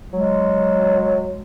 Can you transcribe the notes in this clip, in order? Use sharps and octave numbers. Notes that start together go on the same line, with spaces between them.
F#3 G#3